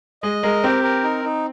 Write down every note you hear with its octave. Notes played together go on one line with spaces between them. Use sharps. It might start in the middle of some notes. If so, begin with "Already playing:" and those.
G#3 D#5
G#3 A#4
C4 G4
A#4
D#4
D#4